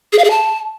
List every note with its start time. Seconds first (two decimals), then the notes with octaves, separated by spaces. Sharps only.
0.13 G#4
0.19 F5
0.24 G#4
0.30 A5